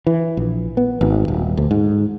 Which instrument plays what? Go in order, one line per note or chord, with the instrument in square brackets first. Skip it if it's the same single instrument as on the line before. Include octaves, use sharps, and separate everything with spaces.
[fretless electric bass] E3
A#1
B3
G#1
D#1
D2
G#2